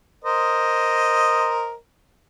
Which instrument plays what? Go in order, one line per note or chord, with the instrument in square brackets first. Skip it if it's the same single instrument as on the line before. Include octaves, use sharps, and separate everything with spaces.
[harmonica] A#4 C5 D#5